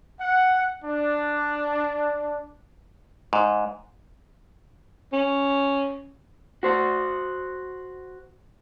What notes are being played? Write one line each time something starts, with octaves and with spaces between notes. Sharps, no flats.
F#5
D4
G#2
C#4
F#4 C5